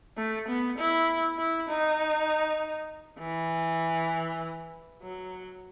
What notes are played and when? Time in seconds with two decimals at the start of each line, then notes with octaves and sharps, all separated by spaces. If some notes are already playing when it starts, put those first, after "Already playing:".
0.17 A3
0.48 B3
0.78 E4
1.38 E4
1.68 D#4
3.20 E3
5.02 F#3